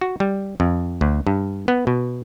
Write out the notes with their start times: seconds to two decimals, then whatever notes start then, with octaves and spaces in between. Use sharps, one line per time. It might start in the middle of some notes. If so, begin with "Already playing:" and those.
0.01 F#4
0.20 G3
0.60 F2
1.01 D2
1.27 G2
1.68 B3
1.87 B2